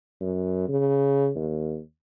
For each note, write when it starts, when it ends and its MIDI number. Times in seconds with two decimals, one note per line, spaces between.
0.21 0.67 42
0.69 1.30 49
1.36 1.79 39